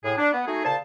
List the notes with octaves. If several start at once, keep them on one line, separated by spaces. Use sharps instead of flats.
A2 G#4
D4
B3
A3 D#4 F#4 G#4
A#2 C#3 C5 A5